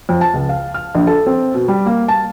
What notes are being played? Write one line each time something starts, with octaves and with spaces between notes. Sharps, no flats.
F2
A5
C#2
F5
F6
A#1
A4
C4
B2
G3
A#3
A5